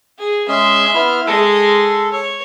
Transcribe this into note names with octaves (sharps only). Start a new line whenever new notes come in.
G#4
G#3 C#4 G#4 E5 C6
B3 E4 F6
G#3 A4 C6
C#5